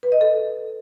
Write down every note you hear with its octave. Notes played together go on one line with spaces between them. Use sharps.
B4
D#5
A4